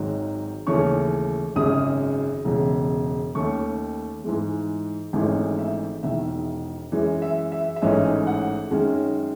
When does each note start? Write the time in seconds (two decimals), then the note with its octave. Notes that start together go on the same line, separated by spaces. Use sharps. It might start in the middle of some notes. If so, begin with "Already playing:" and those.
Already playing: G#1 G#2 D#3 F#3
0.67 D#2 C#3 E3 A3 C#4 C#6
1.56 G#1 F#2 C#3 G#3 C#4 D#6
2.45 E1 E2 C#3
3.35 D#2 D#3 A3 C#4 C#6
4.24 G#2 E3 G#3
5.13 G#1 G#2 E3 A3 C#4
5.59 E5
6.03 E1 E2 D#3 E5
6.92 F#2 E3 G#3
7.22 E5
7.52 E5
7.76 E5
7.82 A1 G#2 E3 A3 C#4 D#5
8.27 F#5
8.71 F#2 D#3 G#3 C#4